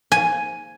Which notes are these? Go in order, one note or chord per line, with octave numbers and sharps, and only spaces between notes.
G#5